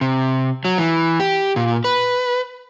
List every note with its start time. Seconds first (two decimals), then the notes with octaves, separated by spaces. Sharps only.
0.01 C3
0.65 F#3
0.78 E3
1.20 G4
1.56 A#2
1.84 B4